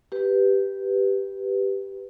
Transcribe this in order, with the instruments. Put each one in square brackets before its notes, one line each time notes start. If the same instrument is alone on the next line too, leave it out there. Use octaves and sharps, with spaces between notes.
[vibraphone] G4 B4